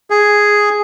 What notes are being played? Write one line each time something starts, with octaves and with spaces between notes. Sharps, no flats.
G#4